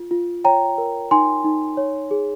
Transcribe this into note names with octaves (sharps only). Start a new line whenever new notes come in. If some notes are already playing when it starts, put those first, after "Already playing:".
Already playing: F4
F4
C#5 G5 A#5
A#4
D#4 G#5 C6
D#4
C#5
G#4